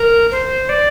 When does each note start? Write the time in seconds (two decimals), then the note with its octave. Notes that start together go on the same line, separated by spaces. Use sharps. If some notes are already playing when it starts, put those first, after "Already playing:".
Already playing: A#4
0.31 C5
0.69 D5